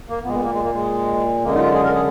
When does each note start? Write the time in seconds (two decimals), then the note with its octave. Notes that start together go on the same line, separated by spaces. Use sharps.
0.09 A#3
0.24 A#2 G#3 B3
0.34 B3
0.39 G#3
0.44 A#3
0.53 G#3
0.64 A#3
0.74 G#3
1.44 F#2 D3 G#3 A#3
1.55 D#4
1.59 F4
1.74 G#4
1.84 A#4
1.95 G#4